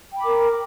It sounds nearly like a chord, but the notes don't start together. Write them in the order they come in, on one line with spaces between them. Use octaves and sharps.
G5 B5 D6 A#4